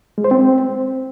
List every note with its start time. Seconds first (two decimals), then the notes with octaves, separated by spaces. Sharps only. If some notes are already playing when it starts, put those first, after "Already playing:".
0.18 G#3
0.24 C5
0.31 C4